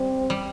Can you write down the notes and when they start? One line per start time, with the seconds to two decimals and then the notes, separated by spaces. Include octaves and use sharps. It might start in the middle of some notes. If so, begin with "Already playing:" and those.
Already playing: G3 C4
0.30 G3